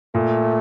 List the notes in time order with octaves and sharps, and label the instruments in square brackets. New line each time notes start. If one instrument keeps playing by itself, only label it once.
[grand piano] A#2 [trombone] A3